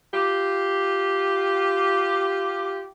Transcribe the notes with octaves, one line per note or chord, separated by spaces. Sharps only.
F4 G4